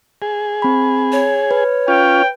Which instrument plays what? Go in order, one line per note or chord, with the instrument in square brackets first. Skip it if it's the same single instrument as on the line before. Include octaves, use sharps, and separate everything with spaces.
[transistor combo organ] G#4
[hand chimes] C4 B5
[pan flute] C#5
[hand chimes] B4
[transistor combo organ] C#4 F4 [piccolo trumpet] G5